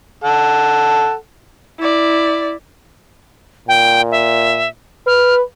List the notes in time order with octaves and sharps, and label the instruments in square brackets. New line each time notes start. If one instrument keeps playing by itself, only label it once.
[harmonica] A4 F#5
[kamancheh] E4 D5
[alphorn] A#2 [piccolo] G5
[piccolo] E5
[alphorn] B4 [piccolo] F6